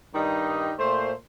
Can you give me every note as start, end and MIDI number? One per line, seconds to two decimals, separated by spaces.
0.14 0.72 43
0.14 0.72 51
0.14 0.72 55
0.14 0.72 63
0.79 1.12 46
0.79 1.12 57
0.79 1.12 72